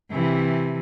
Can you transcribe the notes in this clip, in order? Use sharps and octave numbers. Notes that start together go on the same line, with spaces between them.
C3 E3